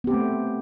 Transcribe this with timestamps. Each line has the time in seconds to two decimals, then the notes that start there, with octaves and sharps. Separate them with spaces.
0.04 B3
0.07 G4
0.10 C4
0.14 A3